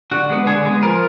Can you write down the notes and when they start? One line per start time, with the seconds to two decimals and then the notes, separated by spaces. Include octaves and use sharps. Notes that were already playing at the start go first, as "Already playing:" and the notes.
0.11 D3 F#4
0.30 G#3 B3
0.46 D3 G#4
0.65 G#3 B3
0.83 F3 A#4